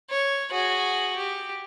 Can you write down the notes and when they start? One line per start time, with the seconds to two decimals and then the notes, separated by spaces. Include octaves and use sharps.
0.10 C#5
0.51 F#4 G#4
1.16 G4